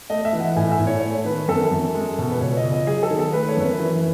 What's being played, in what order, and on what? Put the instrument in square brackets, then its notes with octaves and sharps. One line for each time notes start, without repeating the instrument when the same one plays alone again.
[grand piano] A3 D#5
E5
E3
F#5
A2 G#5
E5
A2
C#5
A3 C#5
D#3 B4
F#2 A4
F#2
G#3
B2
B4
C#2 C#5
D#5
C#2
D#5
F#3 G#4
A4
D#3
A4
A3 B4
C#5
F#2
B4
E3